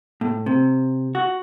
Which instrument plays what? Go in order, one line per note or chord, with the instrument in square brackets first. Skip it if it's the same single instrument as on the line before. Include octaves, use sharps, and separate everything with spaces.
[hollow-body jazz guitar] A2
C3
F#4